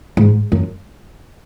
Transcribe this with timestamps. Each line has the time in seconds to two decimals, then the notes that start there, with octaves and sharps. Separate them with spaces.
0.17 G#2
0.52 F#2